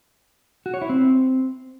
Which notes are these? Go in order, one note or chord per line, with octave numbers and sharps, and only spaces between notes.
F#4
C#5
E4
C4